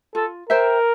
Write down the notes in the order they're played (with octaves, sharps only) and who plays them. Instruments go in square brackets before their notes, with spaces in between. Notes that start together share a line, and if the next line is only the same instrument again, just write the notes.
[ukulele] F4 [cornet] A4
[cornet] A#4 [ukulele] C5 E5 G5